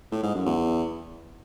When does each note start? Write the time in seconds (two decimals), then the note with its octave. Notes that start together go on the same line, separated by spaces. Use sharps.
0.12 A2
0.23 G#2
0.35 F#2
0.46 E2